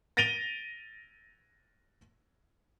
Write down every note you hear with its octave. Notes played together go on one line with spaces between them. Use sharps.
A6 A#6 D7 D#7 F7 G7